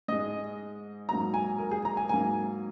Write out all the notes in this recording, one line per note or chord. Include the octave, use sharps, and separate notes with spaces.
G#2 G#3 D#5
G#2 F#3 A#3 A#5
G#5
A#4
G#4
A#5
G#5
G#2 F#3 A#3 G#5